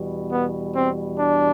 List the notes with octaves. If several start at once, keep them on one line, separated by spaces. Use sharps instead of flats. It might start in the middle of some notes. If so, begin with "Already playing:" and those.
Already playing: E2 B2 G3
B3
C4
D4